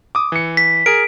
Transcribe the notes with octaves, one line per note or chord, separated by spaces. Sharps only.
D6 D#6
E3 C#7
B6
G#4 A#4 D7